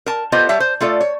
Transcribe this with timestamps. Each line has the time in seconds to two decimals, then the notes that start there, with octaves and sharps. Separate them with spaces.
0.06 A#4 A5
0.32 B3 F4 G4 A4 C5 D#5
0.49 G3 C#5 E5 A5
0.60 C5
0.81 A3 F4 A4 D5
1.01 C#5